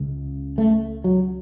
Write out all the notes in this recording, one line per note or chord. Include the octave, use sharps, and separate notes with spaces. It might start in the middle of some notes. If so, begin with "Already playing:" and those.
Already playing: C#2 C#3
A3
F#3